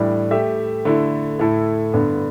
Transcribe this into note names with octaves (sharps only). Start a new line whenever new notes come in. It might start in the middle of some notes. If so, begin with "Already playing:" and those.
Already playing: A2 E3 G3 D4
A3 G4 E5
D3 A3 E4
A2 A3 E4 A4
G2 D3 B3